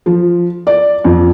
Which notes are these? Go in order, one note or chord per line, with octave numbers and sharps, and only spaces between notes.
F3
D5
F2